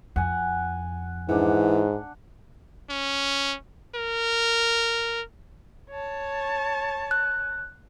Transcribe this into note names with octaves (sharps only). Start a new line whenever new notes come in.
F2 F#5 G#5
G#2 E3 D4 F#5
C#4
A#4
C#5 A5
F#6